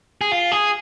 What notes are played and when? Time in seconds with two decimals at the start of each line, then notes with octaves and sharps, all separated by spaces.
0.21 G#4
0.32 F4
0.52 G#4